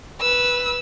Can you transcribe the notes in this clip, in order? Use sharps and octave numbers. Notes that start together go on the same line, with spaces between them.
B4 E6